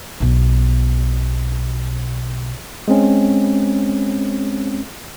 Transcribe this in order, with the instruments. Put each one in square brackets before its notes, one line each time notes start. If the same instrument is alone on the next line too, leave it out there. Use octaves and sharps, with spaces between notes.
[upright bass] B1 B2
[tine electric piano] G#3 C4 C#4